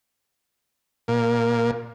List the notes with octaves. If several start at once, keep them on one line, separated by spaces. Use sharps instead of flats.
A#2